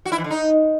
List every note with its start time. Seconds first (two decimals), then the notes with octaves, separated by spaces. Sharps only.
0.05 F#4
0.12 E4
0.18 E3
0.24 D3
0.30 D#4